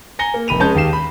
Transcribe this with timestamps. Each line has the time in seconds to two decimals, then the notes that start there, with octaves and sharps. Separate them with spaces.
0.19 G#5 A#5 A#6 C#7 G7
0.34 A#3
0.48 F1 B5 D#7 F7
0.60 G#3 C#4 A5 G6
0.75 D#2 G4 F5 C7 E7
0.93 B5